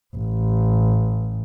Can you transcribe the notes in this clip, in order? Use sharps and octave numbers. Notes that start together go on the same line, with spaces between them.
A1